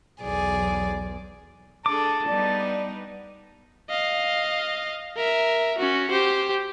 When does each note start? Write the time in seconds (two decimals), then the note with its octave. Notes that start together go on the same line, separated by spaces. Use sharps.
0.21 B1 E2 G#4 D5
1.86 D4 G#4 A4 A5 D6
2.28 G3 B3 D#4 D5
3.89 D#5 F5
5.17 A#4 E5
5.78 C#4 F#4
6.11 G4 C5